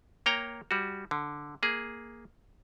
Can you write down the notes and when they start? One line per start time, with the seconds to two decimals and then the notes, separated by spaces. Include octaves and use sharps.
0.26 A#3 C#5 G5 A#5
0.71 G3 F#4
1.11 D3
1.63 A#3 G#4